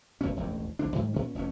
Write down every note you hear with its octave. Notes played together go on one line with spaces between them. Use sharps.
E1 B1 B2 C#4
E1 A1 D#2
B1 D3 F3 D4
G#2 D#3 G3
A#2 C#4
F1 F2 D#3 C#4